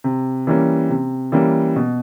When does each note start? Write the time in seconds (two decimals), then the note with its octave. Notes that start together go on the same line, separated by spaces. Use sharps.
0.04 C3
0.47 E3 G3 A#3 C#4
0.90 C3
1.32 E3 G3 A#3 C#4
1.76 B2